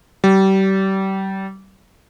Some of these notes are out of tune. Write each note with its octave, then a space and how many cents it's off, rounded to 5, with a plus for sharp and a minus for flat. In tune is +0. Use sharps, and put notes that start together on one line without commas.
G3 -30